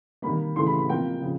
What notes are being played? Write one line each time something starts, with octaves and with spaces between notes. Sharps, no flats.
D#3 G3 A#3 B5
C#3 E3 A3 C6
B5
B5
C3 F3 A#3 G5
C#3 F3